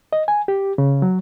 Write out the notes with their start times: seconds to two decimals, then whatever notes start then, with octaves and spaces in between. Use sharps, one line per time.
0.13 D#5
0.28 G#5
0.48 G4
0.78 C#3
1.02 F#3